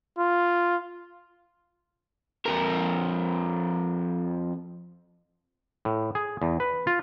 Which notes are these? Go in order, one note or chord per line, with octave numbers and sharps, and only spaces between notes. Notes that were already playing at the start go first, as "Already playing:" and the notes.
F4
F2 A#4
A2
G#4
E2
B4
F4